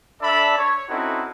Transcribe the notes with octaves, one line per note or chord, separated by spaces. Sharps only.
D4 A4 D5 E5 A5 B5
C#5
C4 C#4 D#4 E4 F#4 A4